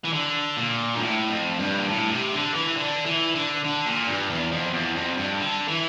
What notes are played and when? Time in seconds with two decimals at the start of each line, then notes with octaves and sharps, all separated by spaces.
0.04 E3
0.13 D3
0.57 A#2
0.95 G2
1.01 A2
1.29 F2
1.59 G2
1.77 A#2
1.89 A2
2.11 C3
2.32 D3
2.54 E3
2.76 D3
3.06 E3
3.35 D3
3.64 D3
3.86 A#2
4.07 G2
4.30 E2
4.52 F2
4.73 E2
4.96 F2
5.17 G2
5.39 D3
5.68 E3